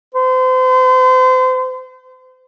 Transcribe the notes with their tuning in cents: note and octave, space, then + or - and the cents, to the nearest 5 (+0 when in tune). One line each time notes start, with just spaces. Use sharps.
C5 -35